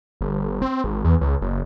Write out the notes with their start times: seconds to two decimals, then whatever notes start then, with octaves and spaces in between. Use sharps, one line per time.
0.21 G1
0.62 C4
0.84 G#1
1.04 E2
1.21 C#2
1.41 F#1